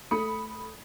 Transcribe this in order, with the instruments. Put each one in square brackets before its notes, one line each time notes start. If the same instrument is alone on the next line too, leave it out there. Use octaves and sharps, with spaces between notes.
[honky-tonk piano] A3 B5 D#6 C#7